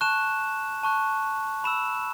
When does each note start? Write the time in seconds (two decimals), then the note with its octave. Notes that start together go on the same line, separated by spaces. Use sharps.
0.01 A5 C#6 F#6 E7
0.83 A5 C#6 F#6
1.64 B5 E6 E7